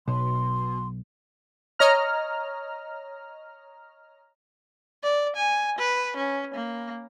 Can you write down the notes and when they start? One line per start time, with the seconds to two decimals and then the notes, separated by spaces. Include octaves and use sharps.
0.08 B1 B2 C6
1.79 C#5 D#5 A#5 F6
5.03 D5
5.36 G#5
5.79 B4
6.17 C#4
6.54 A#3